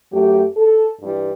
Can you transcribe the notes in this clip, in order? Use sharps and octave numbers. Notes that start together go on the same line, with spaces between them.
F#2 F#3 A3 G4
A4
G2 E3 G3